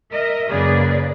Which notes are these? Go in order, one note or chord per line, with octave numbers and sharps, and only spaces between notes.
A#4 D#5 E5
F#2 C#3 A#3 G#4 B4 D5